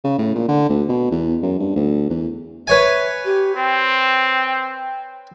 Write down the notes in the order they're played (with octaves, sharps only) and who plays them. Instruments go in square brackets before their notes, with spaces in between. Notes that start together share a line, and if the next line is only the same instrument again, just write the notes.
[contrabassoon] C#3
A2
A#2
D3
D2
B2
E2
F#2
G2
D2
E2
[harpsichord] B4 C#5 G#5 [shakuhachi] E5
[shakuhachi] G4
[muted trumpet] C4 [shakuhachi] G5